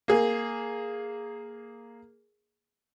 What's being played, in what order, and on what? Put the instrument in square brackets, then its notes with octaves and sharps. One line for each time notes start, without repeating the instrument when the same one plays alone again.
[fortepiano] A#3 G#4